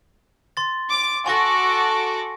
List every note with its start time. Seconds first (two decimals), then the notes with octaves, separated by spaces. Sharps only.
0.57 C6 A6
0.90 D6
1.26 F#4 A4 G#5 C#6 D6 A#6